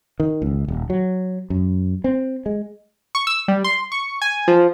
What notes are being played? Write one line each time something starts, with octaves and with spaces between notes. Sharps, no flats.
D#3
C#2
D#1
F#3
F#2
C4
G#3
C#6
E6
G3
C6
C#6
G#5
F3